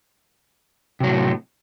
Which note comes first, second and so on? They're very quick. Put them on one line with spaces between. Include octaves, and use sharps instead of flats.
C3 F#3 A2